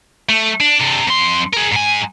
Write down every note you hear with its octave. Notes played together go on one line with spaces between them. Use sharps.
A3
D4
C3 D4
F2 C6
G#4 A#4
G#2 G#5